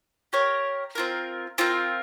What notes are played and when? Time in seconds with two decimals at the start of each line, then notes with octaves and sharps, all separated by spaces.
0.33 G4 A#4 C#5
0.95 C4 F4 A#4
1.58 C4 F4 A#4